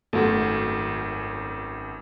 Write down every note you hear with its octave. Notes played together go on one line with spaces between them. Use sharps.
G#1 F#2 A3 F#4